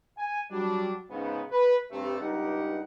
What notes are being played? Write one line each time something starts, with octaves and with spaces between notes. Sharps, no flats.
G#5
F#3 G3 D4
G#2 C#3 B3
B4
G2 C3 A3
C#2 G2 D#4 G4 A#4 F#5